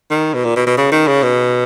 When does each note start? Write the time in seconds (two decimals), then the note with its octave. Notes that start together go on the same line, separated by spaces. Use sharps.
0.11 D#3
0.34 B2
0.44 A#2
0.56 B2
0.66 B2
0.77 C#3
0.92 D#3
1.07 C#3
1.22 B2